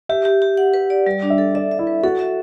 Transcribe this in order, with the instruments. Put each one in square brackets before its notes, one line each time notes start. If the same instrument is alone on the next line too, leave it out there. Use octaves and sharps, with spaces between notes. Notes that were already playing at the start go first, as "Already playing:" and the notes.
[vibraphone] G4 [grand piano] E5
[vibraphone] G4
G4
F#5
B4
D5
G3
D4
[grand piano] E5
[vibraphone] A4
[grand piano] D5 [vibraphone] E5
[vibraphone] E5
[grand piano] E4
[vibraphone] B4
[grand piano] F#4 [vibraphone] A4
[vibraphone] E5